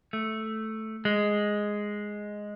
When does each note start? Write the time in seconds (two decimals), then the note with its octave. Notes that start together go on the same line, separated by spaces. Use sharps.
0.13 A3
1.05 G#3